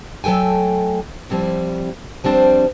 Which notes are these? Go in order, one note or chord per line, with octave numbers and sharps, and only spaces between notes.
F#3 A3 A4 G5 G#5
F3 G3 C4 E4
F3 G3 C4 D4 C5